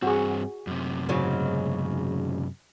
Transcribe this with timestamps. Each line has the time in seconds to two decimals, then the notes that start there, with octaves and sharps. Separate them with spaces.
0.02 G2 C4 F#4 G#4
0.67 F#2 C3
1.09 G#2 C#3 F#3